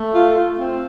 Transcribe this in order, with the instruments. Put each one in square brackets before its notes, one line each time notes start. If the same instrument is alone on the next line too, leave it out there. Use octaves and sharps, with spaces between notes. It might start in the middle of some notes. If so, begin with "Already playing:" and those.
Already playing: [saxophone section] A3
F4
F4
C4